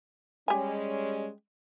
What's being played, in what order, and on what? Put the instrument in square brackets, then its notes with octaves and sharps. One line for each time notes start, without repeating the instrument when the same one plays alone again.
[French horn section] G3 G#3 C#4 [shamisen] G4 G#5